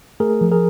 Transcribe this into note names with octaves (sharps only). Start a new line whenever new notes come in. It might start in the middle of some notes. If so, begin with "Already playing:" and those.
A3 G#4 A#4
F3
G#4 A#4